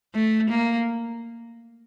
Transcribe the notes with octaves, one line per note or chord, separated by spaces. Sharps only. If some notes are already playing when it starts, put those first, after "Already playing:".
A3
A#3